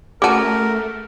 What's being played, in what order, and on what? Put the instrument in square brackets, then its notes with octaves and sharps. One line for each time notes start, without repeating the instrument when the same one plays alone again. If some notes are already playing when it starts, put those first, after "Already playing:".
[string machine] A3 [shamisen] C#4 F#4 [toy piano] G#4 A5 [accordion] A#4